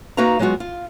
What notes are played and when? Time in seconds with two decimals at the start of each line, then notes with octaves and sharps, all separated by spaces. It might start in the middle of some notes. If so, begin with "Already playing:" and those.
0.17 A#3 D#4 F#4 B4 F5 A#5
0.39 F#3 G#3 B3 F4 F#4
0.60 F4